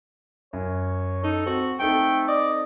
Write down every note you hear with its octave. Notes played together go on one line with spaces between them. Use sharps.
F#2 C#5
D#4 A4
C4 F#4
A3 C4 D#4 A4 G5
D5 D#5